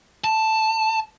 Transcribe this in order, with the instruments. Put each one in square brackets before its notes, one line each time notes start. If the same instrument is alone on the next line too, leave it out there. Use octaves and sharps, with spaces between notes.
[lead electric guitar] A5